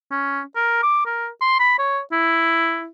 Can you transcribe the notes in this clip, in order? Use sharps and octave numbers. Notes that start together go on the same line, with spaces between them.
C#4
A#4
D6
A#4
C6
B5
C#5
E4